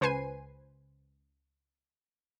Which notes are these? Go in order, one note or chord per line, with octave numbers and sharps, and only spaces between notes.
C#2 B4 C5 G#5 C7 D#7